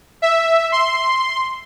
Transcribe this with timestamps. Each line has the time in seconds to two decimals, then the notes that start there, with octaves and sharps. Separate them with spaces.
0.22 E5
0.72 C6